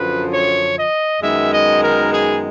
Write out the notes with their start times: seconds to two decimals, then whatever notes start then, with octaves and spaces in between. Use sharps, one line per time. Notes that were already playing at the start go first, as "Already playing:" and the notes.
Already playing: F#2 D3 F3 B4
0.31 C#5
0.76 D#5
1.21 F#2 D#3 G#3 B3 D#4 E5
1.52 D#5
1.82 A#4
2.12 G#4